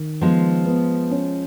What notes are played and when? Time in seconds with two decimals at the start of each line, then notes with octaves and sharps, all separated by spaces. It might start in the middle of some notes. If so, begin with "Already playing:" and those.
Already playing: D#3
0.21 F3 G#3 B3
0.66 B3
1.11 C#4